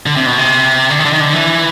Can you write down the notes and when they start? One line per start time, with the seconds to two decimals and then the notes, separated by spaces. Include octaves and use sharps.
0.06 D3
0.16 C3
0.26 B2
0.38 C3
0.90 D3
0.99 D#3
1.05 D3
1.13 D#3
1.21 D3
1.33 E3